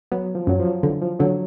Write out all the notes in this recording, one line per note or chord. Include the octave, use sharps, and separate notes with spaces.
F#3 B3
F3
F#2 F#3
F3
D3 E3
F3
D3 F#3